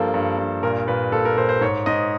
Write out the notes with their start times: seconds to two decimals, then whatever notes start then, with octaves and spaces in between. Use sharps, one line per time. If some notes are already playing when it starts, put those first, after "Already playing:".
Already playing: G2 F3 A#3 A4
0.14 G2
0.38 G2
0.63 A#2 A#4
0.88 A#2 B4
1.12 A#2 A4
1.25 A#4
1.37 A#2 C5
1.49 C5
1.61 G#2 C#5
1.86 G#2 D#5